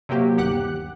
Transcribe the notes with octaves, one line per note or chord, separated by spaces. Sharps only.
C3 F#3 A#3 G4
G1 D#2 G4 F#5 F#6